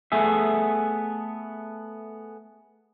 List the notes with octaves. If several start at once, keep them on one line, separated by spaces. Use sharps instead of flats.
A3 B3 G#4 E5